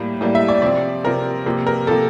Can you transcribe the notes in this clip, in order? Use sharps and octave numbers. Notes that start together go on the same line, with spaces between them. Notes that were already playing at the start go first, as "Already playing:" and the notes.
Already playing: A2 G3 A#3
A2 G3 A#3
E5
D5
C3 F3 C4 D5
C3 F3 C4 A#4
C3 F3 A#3
A#4
C3 F3 A#3 A4